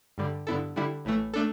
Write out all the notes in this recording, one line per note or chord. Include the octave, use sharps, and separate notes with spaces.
G2 D3 G3
G2 D3 B3 E4 A4
D3 G3 E4
A1 A2 E3 A3
A3 D4 A4